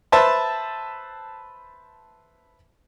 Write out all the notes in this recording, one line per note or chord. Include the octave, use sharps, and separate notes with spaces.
B4 C5 E5 A5 B5